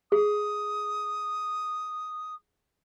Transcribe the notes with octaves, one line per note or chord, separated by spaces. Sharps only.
G#4 D#6